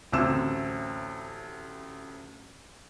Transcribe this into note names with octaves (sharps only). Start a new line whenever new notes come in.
A1 D2 C4 E6 E7